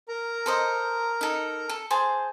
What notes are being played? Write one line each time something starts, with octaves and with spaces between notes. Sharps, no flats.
A#4 A#5
A4 C5 D#5
D#4 A4
A4
G#4 C5 A5